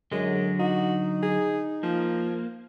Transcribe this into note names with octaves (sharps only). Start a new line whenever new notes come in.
F#2 D3 F#3 G#3
D#4 F#4
G#4
F3 A#3